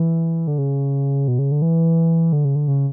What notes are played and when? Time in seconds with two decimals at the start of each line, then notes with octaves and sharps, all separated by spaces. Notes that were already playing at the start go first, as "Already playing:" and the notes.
Already playing: E3
0.47 D3
0.58 C#3
1.28 B2
1.39 C#3
1.51 D3
1.62 E3
2.33 D3
2.45 C#3
2.55 D3
2.68 C#3